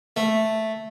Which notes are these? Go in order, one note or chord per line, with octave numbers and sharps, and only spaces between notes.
A3